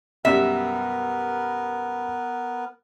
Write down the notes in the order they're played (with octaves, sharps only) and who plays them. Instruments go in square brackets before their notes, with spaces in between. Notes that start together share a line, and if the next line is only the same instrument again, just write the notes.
[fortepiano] F#2 B2 G3 [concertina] B3 A#4 B4 [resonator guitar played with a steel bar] E5